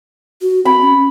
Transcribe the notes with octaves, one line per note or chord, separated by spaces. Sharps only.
F#4
C4 B5
C#4